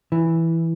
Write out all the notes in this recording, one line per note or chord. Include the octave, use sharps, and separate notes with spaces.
E3